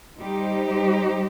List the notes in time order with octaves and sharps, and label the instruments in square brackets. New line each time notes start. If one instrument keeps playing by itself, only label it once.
[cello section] G3 D#4 G4 C5